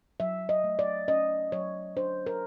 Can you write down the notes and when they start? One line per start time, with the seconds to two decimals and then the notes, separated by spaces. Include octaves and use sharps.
0.20 F#3 E5
0.49 D#5
0.64 A3
0.79 D5
1.08 C#4 D#5
1.52 F#3 C#5
1.97 D4 C5
2.26 A#4